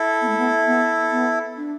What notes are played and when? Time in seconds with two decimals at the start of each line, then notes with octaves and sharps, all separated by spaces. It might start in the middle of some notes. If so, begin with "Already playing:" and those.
Already playing: E4 A4
0.21 B3
0.29 A3
0.38 B3
0.67 B3
1.11 B3
1.57 D4